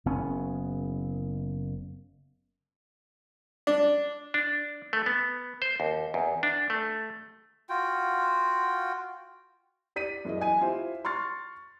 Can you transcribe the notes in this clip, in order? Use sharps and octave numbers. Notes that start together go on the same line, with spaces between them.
F#1 B3 C#4
D4
D4
A3
B3
C5
D#2
E2
D4
A3
F4 F#4 G5
G4 D5 B6 D#7
F#2 E3 G#4 D#5
D#5 G#5 D#7
E4 F4 G4 C5
C6 C#6 F6 A6